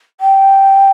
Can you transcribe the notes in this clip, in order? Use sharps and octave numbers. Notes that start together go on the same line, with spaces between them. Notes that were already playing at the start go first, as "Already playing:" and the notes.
G5